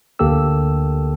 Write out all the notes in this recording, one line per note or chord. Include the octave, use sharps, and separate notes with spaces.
D2 D3 A#3 G4 A4 E6